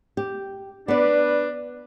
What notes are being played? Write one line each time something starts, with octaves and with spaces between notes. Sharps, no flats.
G4
B3 D4 B4 D5